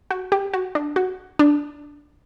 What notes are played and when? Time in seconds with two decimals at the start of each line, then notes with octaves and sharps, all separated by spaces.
0.11 F#4
0.32 G4
0.54 F#4
0.75 D4
0.96 F#4
1.39 D4